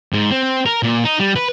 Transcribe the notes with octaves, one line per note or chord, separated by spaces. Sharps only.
G#2
C4
A#4
A#2
D#4
G3
B4